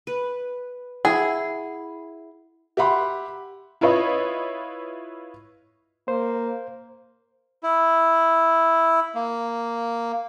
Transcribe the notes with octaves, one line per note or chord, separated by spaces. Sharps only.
B4
E4 G#4 F#5
G4 E5 F#5 B5 C6
E4 F4 B4 C#5 D#5
A#3 C5
E4
A#3